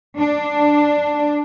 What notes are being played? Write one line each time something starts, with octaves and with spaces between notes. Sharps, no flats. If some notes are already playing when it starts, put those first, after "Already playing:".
D4